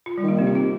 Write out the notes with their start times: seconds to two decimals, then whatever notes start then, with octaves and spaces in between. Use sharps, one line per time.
0.06 F4
0.18 G3
0.23 D#3
0.28 A#3
0.39 C3 C4
0.47 F4
0.55 G4